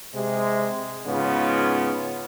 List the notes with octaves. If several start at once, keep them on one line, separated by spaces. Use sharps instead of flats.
C3 G#3
G#2 C#3 B3 F4